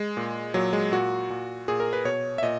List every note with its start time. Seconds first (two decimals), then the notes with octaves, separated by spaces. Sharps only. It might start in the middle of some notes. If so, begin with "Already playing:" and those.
Already playing: G#3
0.17 A#2
0.54 A#2 F#3
0.73 G#3
0.92 A#2 F#4
1.30 A#2
1.68 A#2 G#4
1.80 A#4
1.93 B4
2.05 B2 C#5
2.38 E5
2.43 A#2 D#5